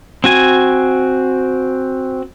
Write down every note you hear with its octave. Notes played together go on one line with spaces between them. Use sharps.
C4 F#4 G#5